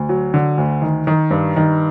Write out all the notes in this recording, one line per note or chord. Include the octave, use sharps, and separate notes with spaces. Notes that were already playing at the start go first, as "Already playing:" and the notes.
Already playing: D2
F#3
D3
D2
D#3
D#3
G2
D#3